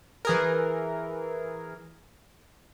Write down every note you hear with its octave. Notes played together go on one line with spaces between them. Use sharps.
E3 G#4 A#4